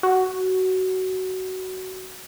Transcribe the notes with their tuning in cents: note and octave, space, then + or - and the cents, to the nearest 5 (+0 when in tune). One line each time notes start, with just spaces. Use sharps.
F#4 +15